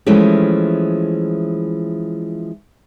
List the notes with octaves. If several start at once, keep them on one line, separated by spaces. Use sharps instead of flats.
E3 F3 G#3 A3 C#4 G4